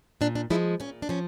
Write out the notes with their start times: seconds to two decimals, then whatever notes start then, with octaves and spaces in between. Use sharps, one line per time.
0.21 A#2 D4
0.35 D4
0.50 F3 G#3 E4
0.80 A#2 C#4
1.02 D4
1.09 F3 C#4